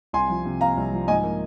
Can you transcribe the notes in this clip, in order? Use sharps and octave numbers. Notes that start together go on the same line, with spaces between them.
C2 G#5 C6
F3
C3
C4 F5 A#5
C2
F3
G#2 D#5 G#5
A#3